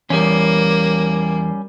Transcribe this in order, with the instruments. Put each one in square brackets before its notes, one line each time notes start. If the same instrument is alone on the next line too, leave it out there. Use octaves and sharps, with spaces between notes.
[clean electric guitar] E2 [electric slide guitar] G3 C#4 [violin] A#3